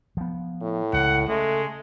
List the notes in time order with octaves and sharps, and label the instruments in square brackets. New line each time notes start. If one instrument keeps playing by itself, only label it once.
[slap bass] F3 B3
[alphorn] A2
[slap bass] C#2 C#3 [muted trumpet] F#5
[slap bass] C#3 [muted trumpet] G#3 [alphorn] A3